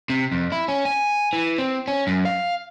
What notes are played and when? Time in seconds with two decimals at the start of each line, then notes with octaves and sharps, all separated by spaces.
0.10 C3
0.32 F2
0.52 E4
0.68 C#4
0.85 G#5
1.33 E3
1.58 C4
1.88 C#4
2.07 F#2
2.25 F5